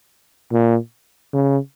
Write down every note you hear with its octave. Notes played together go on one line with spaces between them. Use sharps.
A#2
C#3